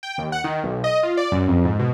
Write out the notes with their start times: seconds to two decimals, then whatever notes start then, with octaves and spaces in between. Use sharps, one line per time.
0.03 G5
0.18 D#2
0.32 F#5
0.44 D#3
0.63 B1
0.84 D#5
1.03 F4
1.17 D5
1.32 F#2
1.48 F2
1.65 G#2
1.79 B2